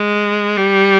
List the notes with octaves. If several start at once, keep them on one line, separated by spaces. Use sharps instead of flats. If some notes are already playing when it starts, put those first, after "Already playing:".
Already playing: G#3
G3